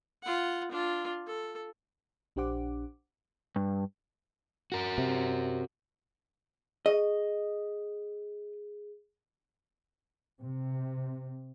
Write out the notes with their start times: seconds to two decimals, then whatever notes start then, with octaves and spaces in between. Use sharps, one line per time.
0.23 F4 F#5
0.71 D4 F4
1.27 A4
2.36 A#1 D4 G4 C5 F#5 D6
3.56 G2
4.72 F#4 A#4
4.98 C3
6.86 G#4 D#5
10.40 C3